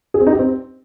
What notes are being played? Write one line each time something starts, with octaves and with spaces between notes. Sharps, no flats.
G#4
C4
D#4
G4
C4